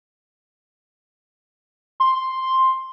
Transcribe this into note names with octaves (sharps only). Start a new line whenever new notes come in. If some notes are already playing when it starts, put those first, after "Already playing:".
C6